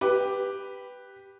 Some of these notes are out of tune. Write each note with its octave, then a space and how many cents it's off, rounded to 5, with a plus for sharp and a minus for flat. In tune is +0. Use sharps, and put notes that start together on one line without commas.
G4 +0 B4 +0